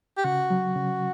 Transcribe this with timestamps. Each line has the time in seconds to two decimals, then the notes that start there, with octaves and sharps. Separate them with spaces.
0.17 G4
0.24 C#3 F#4
0.50 F#3
0.76 C#3